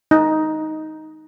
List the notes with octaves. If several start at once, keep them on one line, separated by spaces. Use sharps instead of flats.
D#4